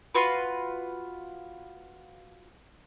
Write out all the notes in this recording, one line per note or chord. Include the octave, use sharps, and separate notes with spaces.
F4 F#4 B4